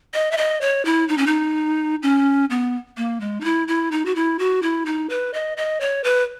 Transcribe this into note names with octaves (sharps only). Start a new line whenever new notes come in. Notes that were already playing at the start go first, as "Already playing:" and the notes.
D#5
E5
D#5
C#5
E4
D#4
C#4
D#4
C#4
B3
A#3
G#3
D#4
E4
E4
D#4
F#4
E4
F#4
E4
D#4
B4
D#5
D#5
C#5
B4